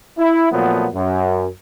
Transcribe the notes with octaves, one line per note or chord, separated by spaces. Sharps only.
E4
A#2 F3 F#3 A3 B3
F#2